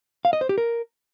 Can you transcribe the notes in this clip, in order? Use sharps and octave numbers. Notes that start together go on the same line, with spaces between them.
F5
D#5
C5
G4
A#4